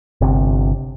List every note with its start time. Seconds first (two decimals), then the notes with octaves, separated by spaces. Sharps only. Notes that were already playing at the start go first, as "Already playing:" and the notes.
0.21 G1 C3